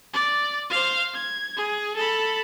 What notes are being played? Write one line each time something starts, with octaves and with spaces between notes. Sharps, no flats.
D5
C5 F5
G#6
G#4
A4 B5